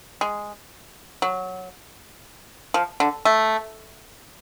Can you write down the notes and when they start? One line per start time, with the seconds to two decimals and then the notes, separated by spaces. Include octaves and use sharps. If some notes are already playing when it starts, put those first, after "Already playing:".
0.21 G#3
1.22 F#3
2.74 F3
3.00 D3
3.25 A3